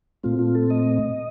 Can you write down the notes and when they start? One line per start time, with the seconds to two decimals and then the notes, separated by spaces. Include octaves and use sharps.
0.24 A#2 A3 C4 F4
0.39 F4
0.55 A4
0.70 D#5